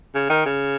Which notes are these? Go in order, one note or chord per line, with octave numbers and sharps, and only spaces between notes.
C#3
D#3
C#3